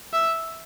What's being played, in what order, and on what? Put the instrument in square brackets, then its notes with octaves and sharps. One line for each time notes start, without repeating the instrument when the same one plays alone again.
[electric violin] E5